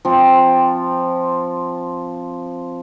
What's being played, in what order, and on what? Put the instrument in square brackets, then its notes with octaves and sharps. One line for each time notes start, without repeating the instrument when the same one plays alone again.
[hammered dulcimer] F3 C4